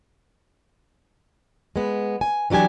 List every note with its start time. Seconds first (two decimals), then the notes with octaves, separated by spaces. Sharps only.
1.76 G#3 B3
2.21 G#5
2.50 E3 F#3 D4 G4 G#5